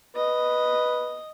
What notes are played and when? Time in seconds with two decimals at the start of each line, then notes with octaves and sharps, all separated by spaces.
0.16 B4 D#5